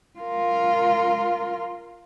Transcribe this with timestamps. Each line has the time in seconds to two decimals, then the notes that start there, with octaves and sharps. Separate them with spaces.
0.20 F4 A#4